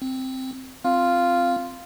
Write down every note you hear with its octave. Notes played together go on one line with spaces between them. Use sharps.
C4
C4 F4